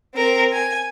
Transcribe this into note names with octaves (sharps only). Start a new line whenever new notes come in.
C4 A#4
G#5